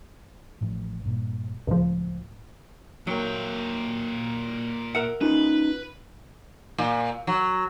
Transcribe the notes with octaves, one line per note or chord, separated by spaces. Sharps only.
A1 A2 F3
G2 A#2
C#2 A2 F3
A#2 F#3 A#3 G5
A#4 E5 F#5
C#4 D#4 F4 B4
A#2
F#3